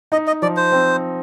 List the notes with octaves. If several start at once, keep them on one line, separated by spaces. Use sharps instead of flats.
D#4 D#5
D#5
F3 D5
C5
C4